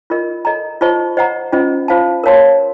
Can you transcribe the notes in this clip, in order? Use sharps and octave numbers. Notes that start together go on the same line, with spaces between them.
F4 A#4 D#5
A4 D#5 A#5
F4 C5 D#5 A5 C#6
C5 D#5 F#5 A#5
C#4 F4 C5 D#5
F4 C5 F5 A5
A#4 C#5 F5 A5 C6